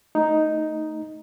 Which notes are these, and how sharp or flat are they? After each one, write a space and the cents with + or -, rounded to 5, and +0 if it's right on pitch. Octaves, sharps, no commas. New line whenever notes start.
A3 +20 D#4 +0